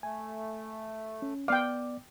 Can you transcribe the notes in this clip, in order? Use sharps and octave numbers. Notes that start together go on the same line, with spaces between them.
A3 G#5
C#4
B3 D5 F5 G5 D6